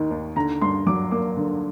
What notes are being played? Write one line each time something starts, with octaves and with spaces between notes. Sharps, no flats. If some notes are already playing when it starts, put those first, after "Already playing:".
Already playing: D#2 D#3
D#2
D3 A#5
G2 C6
F#3 D6
A#3 D6
D3